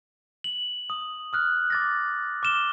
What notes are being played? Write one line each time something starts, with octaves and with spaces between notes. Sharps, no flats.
F#7
D#6
D#6 F6 F#6
D6 A6 A#6
D6 F6 E7 G7